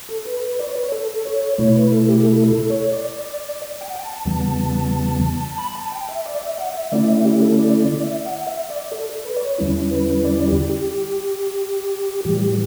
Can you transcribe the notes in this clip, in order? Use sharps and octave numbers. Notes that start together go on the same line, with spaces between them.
A4
B4
D5
C#5
B4
C#5
A4
C#5
B2 A3 E4 C#5
B4
A4
G4
A4
A4
C#5
D5
G5
F#5
G5
A5
E2 C#3 E3 G3 B3
B5
A5
G5
E5
D5
E5
F#5
E5
D3 A3 C#4 E4 D5
E5
G4
A4
D5
D5
E5
F#5
F#5
E5
D5
A4
B4
D5
C#5
E2 D3 G3 C#4 E4
B4
D5
G4
G4
A2 E3 G3 G4
G4